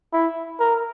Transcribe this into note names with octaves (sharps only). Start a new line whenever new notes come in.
E4
A#4